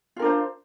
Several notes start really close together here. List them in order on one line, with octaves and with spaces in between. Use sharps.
F4 A#4 D4 C5